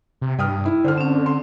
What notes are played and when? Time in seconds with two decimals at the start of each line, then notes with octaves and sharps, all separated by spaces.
0.21 C3
0.39 G2 G5 D#6 F6
0.65 E4
0.84 D3 C5 F6
0.98 C4 C#4
1.26 C6